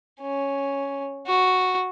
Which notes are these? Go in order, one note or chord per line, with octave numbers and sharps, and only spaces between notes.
C#4
F#4